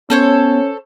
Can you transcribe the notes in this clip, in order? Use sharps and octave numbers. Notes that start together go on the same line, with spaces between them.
B3 C#4 A4 C5 C#5